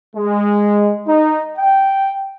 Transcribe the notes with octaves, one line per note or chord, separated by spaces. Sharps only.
G#3
D#4
G5